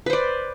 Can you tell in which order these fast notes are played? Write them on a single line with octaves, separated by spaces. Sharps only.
B4 C5 D5